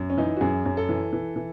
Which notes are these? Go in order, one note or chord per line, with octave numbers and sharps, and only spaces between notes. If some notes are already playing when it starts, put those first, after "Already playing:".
Already playing: F#2
C#4
E3 D#4
F#4
F#2 G#4
F#2
A4
E3
E3
E3